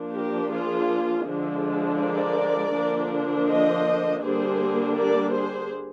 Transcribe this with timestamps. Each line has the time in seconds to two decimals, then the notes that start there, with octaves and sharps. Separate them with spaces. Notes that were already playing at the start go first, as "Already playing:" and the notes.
Already playing: F3 A#3 D4
0.15 G4 A#4
0.52 F4 G#4
1.27 D3 F3 G#3 D4
2.00 A#4 D5
2.74 D3 F3 A#3 D4
3.48 C5 D#5
4.22 D3 G3 A#3 D4 G#4 C5
4.97 A#4 D5
5.33 G#4 C5